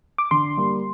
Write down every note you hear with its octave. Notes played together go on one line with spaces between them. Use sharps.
D6
D3 C6
G3 A#3